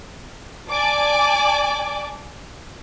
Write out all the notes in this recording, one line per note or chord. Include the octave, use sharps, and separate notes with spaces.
D5 G#5 A5 D6